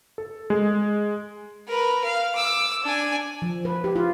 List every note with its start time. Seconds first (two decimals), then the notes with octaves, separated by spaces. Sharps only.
0.18 A4
0.50 G#3
1.68 A#4 B4
2.04 F5
2.36 D6 E6
2.83 D4 G#5
3.42 F3
3.65 B4
3.84 G4
3.96 F4